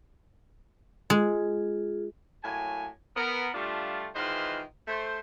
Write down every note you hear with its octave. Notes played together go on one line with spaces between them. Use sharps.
G#3 F4 G#4
A2 F#3 A#3 G#5
B3 A#4
G3 A3 D4 F4
D#3 E3 G#3 F4 B4 C5
A3 C5